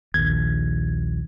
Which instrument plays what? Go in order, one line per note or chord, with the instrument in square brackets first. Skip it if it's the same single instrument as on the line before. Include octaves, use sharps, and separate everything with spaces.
[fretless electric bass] A#1 D#2 [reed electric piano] G#6